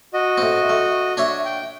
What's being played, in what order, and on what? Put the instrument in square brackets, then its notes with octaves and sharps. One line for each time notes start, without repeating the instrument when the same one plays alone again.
[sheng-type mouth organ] F#4 D#5
[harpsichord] A2 C4
A3
D4 C#5 E5
[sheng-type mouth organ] G5